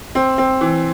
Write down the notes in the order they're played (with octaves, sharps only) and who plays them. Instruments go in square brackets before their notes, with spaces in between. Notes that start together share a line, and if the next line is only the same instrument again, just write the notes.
[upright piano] C4
C4
E3